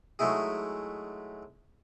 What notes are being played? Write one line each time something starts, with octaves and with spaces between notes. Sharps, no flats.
F#3 G#3 A3 D#4 E4 G#4